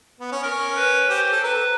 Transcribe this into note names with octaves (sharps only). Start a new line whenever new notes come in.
B3
C#4
C#4 A#4
B4
G4 C5
A4
A#4 B4
A#4